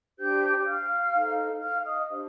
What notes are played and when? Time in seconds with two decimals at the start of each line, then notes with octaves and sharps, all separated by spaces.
0.18 D4 G4 C5 G5 G6
0.66 F5 F6
1.14 D#4 A4 C5
1.61 F5 F6
1.85 D#5 D#6
2.09 D4 G4 C5